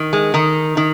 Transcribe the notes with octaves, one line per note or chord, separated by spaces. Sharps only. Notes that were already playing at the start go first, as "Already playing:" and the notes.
Already playing: D#3
G#3
D#3 D#4
D#3